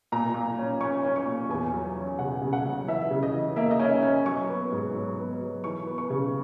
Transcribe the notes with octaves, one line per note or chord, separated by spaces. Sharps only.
A#2 A#5
A#2
C#4
C#4 C#6
C#4
C#6
A#2
E2 G#5
F#3
C#4
C#3 F#5
C#3
F#5
F#3
E3 E5
C#3
D#5
E3
A#3 E5
D#5
C#4 E5
C#4
F#3 C#6
B3
G#2
F#3
B3
F#3
E3 C#6
B3
C#6
C#3